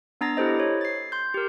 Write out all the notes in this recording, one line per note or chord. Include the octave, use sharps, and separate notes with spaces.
B3 D4 A#5 A6 A#6
E4 G4 A4 C5 D#5
C#5
A6 C7
C6 G6
G4 A#4